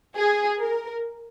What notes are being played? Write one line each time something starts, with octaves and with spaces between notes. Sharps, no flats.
G#4
A#4